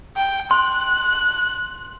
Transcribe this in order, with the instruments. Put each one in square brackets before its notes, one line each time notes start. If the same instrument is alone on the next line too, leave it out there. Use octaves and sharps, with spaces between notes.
[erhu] G5
[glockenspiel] C6 [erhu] F#6